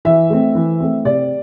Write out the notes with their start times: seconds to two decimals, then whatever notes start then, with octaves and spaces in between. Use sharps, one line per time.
0.05 E3 E5
0.30 A3 C4
0.55 E3
0.80 A3 C4
1.05 C3 D5